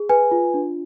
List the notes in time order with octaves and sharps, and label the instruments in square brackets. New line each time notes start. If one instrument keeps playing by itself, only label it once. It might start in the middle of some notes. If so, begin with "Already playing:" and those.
Already playing: [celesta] G#4
B4 G#5
F4
D4